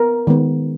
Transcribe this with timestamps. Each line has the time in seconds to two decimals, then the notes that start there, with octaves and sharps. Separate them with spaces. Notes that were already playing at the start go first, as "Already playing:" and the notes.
Already playing: B3 A#4
0.27 D#3 G#3 B3